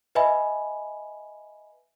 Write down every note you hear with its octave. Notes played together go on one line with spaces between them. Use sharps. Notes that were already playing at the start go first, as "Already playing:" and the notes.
B4 D#5 E5 G#5 B5